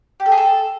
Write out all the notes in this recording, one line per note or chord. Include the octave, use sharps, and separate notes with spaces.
G4
A4
G#4
A4